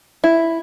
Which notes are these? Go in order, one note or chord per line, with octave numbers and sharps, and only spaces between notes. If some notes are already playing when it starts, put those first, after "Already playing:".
E4